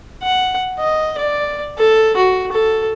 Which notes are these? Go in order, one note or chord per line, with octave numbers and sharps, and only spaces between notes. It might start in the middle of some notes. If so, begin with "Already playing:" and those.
F#5
D#5
D5
A4
F#4
A4